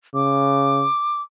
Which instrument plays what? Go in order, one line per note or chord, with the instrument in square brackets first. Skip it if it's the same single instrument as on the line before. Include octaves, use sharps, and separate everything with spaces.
[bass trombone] C#3 [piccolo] D6